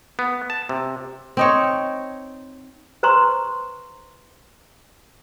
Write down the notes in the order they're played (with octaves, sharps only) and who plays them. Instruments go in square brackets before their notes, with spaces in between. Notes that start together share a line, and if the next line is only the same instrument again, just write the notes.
[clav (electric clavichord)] B3
A5
C3
[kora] C4 D#4 C#5
[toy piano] B4 C5 A#5 C6 C#6